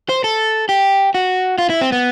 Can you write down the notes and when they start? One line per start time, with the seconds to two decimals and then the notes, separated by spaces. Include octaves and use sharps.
0.09 C5
0.24 A4
0.69 G4
1.14 F#4
1.58 F4
1.70 E4
1.81 C4
1.92 B3